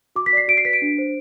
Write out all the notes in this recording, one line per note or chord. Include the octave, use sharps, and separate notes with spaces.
F#4 D6
B6
D5 C7
F#4 D7
C7
B4 B6
D7
D4
C5